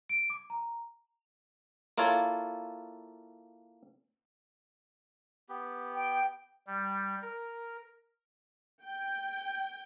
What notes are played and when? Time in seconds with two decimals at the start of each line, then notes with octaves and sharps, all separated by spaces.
0.09 D7
0.30 D6
0.50 A#5
1.98 A#3 E4 F4 A4 C#5
5.49 B3 G4
5.95 G5
6.67 G3
7.22 A#4
8.85 G5